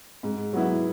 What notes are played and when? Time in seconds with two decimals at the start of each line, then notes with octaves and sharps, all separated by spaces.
0.23 G#2
0.53 F#3 B3 E4